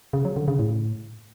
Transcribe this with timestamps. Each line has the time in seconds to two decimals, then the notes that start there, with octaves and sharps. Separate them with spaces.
0.13 C#3
0.25 F#3
0.36 D3
0.48 C#3
0.59 A2